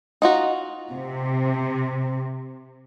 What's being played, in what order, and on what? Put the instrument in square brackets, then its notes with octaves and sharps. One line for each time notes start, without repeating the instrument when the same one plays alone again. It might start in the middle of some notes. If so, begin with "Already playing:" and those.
[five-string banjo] D#4 F4 F#4
[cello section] C3